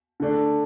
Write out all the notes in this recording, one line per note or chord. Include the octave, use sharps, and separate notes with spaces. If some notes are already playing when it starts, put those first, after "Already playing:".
D3 A3 D4